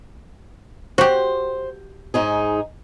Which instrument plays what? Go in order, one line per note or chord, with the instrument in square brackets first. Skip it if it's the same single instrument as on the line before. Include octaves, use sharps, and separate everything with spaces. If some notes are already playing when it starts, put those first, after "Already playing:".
[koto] F#4 G4 [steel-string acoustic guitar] C5
[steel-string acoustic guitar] G#2 D#4 G#4